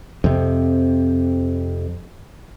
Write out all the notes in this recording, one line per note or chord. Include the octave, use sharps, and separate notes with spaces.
F2 C3